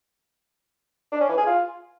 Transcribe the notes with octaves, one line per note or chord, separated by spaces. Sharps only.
D4
C#4
E3
G#4
F4